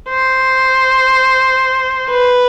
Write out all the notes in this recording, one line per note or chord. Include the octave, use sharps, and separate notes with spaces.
C5
B4